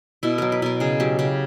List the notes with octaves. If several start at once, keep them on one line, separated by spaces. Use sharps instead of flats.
B2 E4
F#3 A#4
B4
B2 A#4
C#3 G#4
F#3 G4
C#3 G4